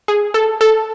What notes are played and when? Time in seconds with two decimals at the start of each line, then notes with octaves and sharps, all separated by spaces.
0.08 G#4
0.34 A4
0.61 A4